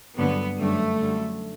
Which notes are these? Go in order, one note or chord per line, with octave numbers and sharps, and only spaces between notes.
G2 D3 F#3 B3
F#2 D3 G3 A3
F#2 D3 G3